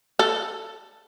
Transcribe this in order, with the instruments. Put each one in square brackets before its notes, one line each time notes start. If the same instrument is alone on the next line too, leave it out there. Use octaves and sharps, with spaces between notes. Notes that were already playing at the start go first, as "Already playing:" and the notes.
[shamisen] A4